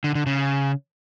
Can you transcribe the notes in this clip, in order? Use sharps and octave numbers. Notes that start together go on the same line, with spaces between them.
D3
D3
C#3